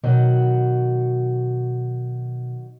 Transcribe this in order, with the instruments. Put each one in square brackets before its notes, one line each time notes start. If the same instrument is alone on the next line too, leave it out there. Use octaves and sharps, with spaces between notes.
[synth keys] B2 [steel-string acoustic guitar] D#3 F#3 F#4